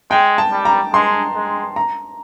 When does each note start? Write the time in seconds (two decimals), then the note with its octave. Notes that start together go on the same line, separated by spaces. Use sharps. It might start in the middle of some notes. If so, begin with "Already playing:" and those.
0.11 G#3 G5
0.38 A5
0.52 G3
0.65 A#5
0.94 G#3 C6
1.35 G#3
1.76 A#5